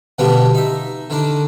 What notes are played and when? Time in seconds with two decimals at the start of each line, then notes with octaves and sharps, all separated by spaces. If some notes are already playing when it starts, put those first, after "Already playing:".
0.18 B2 D3 F3 G3 B3 D4
0.55 D#4 E5
1.10 D3 D#3 D4